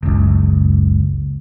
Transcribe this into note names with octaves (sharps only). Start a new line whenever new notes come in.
F#1 C#2